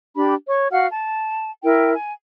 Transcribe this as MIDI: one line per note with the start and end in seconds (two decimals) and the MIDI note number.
0.15 0.34 62
0.15 0.34 67
0.15 0.34 83
0.47 0.67 73
0.47 0.67 85
0.71 0.88 66
0.71 0.88 77
0.71 0.88 78
0.71 0.88 89
0.90 1.50 81
1.63 1.94 64
1.63 1.94 70
1.63 1.94 79
1.94 2.13 80